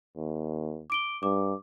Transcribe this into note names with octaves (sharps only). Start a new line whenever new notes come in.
D#2
D6 D7 G7
G2 D6